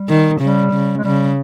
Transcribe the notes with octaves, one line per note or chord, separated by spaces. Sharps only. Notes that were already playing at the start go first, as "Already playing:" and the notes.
Already playing: G3
D#3
C#3 G3
C#3
G#3
C#3 G3